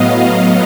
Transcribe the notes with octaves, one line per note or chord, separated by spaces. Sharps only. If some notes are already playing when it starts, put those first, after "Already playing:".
Already playing: A2 F#3 B3 D#5 F5